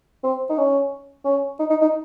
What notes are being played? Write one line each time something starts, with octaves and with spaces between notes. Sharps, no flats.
C4
D#4
C#4
C#4
D#4
D#4
D#4